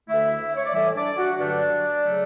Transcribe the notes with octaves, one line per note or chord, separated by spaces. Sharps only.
D2 D3 A3 E4 E5
C#5
D5
A2 E3 G3 E4 E5
D4 D5
F#4 F#5
G2 D3 F#3 A3 D4 D5
C#3 F#3 A3